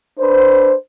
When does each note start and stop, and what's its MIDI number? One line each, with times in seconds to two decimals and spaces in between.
0.19 0.74 62
0.19 0.74 71
0.19 0.74 72